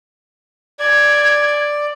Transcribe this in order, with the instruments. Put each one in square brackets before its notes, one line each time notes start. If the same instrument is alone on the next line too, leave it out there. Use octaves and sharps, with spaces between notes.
[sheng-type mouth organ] D5 [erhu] G#6